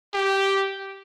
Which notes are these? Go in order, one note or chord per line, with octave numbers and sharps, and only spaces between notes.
G4